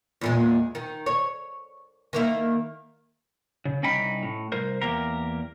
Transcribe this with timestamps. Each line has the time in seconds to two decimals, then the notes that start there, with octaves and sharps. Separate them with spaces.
0.21 E2 A#2 G#3
0.75 D#3
1.06 C#5
2.13 D#3 A#3 E4
3.65 C#3
3.83 C2 C#4 D#4 G5 B5
4.23 A2
4.52 C2 A#4 C5
4.81 E2 A#3 G4 A#4